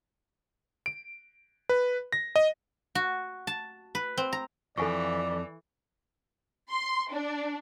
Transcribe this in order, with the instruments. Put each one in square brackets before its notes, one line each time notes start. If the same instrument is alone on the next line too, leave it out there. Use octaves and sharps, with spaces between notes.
[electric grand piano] D7
B4
A#6
D#5
[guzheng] F#4
A5
B4
C4
A#5
[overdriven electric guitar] F2 [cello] E3 [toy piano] A4 G#5 C#6 [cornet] D5
[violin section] C6
D4